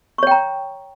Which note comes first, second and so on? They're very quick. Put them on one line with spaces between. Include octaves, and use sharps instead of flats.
C#6 C#5 G5 A#5